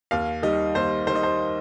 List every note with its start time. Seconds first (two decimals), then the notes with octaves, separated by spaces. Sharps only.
0.11 D#2 F5
0.43 D#3 G3 D#5
0.75 D#2 C5
1.07 D#3 G3 C5
1.15 D#5
1.23 C5